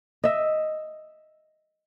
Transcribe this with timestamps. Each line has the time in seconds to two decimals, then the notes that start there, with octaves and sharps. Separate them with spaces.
0.24 D#5 E5